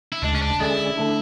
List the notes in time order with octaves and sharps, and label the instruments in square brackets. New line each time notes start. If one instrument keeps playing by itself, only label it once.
[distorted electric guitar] E4
[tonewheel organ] D2 C#3 G#3 [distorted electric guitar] D4
[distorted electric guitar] C#4
D4
[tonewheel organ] D3 G#3 C#4 G#4 D5 [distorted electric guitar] E4
[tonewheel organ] D3 A3 D4